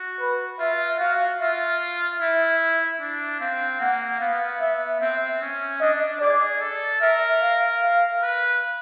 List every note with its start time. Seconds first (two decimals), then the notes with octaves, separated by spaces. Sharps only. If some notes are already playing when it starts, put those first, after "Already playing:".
Already playing: F#4
0.20 B4
0.59 F4 E5
0.99 F#4 F5
1.40 F4 E5
2.20 E4 E5
3.00 D4
3.40 C4 F5
3.80 A#3 F#5
4.20 B3 F5
4.61 B3 E5
5.01 C4 E5
5.41 C#4
5.80 D4 D#5
6.21 G#4 D5
6.61 A4
7.01 A#4 E5
7.42 F5
7.82 F5
8.22 B4